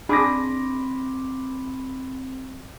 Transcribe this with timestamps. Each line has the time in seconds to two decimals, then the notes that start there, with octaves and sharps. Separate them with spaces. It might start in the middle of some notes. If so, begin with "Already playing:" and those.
0.09 C4 D4 G#4 B5 D6 A#6